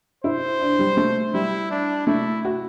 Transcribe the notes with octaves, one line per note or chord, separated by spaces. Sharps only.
E4 C5
D4
G3
A3
G3 E4
D4
A3 E4
F#4